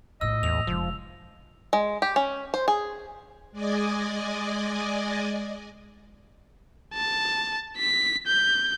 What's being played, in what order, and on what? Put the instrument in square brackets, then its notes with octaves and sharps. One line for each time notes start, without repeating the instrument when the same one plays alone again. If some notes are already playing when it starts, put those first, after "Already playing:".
[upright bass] A#1 A2 [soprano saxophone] D#5 [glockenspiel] E6
[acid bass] E2 [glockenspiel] F7
[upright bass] F1 G#3 [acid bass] F3
[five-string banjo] G#3
G4
C#4
C5
G#4
[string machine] G#3 D5 D#5 G#5
[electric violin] A5
B6
G6